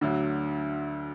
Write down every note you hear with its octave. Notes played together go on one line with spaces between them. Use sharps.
D2 D3 F#3